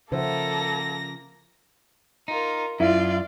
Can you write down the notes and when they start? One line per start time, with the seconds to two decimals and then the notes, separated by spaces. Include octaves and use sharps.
0.12 C#3 F3 A#3 A4 C5 E5 F#5 A#6
2.28 D#4 F4 A#4
2.80 F#2 E4 F4 D5